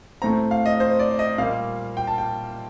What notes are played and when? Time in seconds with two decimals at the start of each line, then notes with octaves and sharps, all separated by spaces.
0.22 A2 A3 C4 A#5
0.51 F5
0.66 D#5
0.80 C5
0.99 D5
1.19 D#5
1.38 A#2 G3 A#3 F5
1.97 G5
2.07 A5
2.18 G5